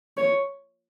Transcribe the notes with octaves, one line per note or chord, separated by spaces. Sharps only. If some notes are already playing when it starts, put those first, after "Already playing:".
C#5